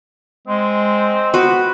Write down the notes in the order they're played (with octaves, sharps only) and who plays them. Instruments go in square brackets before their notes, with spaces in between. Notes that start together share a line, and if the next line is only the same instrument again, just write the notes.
[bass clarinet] G#3 [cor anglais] C4
[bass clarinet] B3 [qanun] F#4 B4